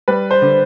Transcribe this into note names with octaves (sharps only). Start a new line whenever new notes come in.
G3 B4
C5
D3